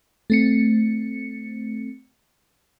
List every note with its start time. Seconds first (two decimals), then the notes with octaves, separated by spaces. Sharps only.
0.30 A3 C4 C#7